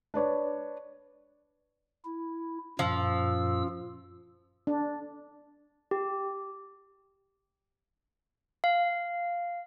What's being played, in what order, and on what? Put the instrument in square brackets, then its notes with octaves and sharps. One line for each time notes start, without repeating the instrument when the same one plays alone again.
[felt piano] D4 B4 C#5 D5
[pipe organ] E4
[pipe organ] F#2 A#2 E6 [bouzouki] F3
[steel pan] D4
[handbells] G4
F5